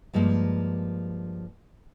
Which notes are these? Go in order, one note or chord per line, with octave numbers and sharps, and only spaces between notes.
G2 F3 G#3 A#3